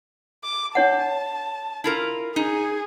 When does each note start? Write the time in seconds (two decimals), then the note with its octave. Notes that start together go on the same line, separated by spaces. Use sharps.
0.44 D6
0.75 D4 C#5 F#5 A5
1.84 E4 F4 A#4
2.36 D#4 G#4